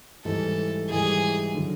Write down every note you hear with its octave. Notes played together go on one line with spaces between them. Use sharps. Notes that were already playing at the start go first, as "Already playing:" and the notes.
G#2 E3 G3 A4
G#2 E3 G3 G#4
D3 F#3